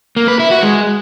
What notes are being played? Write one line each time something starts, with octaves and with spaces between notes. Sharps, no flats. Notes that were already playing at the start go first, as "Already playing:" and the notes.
A#3
B4
E4
F#4
G#3